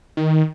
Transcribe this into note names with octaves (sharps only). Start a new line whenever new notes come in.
D#3